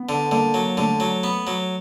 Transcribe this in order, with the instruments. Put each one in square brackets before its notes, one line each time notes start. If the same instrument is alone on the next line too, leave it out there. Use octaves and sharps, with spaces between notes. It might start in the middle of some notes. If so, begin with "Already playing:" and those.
Already playing: [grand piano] B3
[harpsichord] D3
[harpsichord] D3 [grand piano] A#3
[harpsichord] F#3
[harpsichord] D3 [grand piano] A3
[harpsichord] F#3
B3
F#3